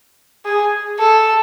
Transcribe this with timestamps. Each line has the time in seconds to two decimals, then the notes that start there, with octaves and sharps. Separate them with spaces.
0.45 G#4
0.99 A4